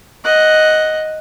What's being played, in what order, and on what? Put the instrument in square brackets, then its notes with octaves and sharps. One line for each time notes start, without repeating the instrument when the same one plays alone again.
[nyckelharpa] D#5 F#5